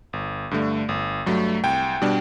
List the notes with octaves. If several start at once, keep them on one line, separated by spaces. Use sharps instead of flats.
G1
G2 D3 A3
G1
G2 F#3 A3
C2 G5
B2 G3 D4